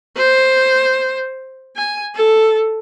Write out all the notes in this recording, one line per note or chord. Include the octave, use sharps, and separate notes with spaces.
C5
G#5
A4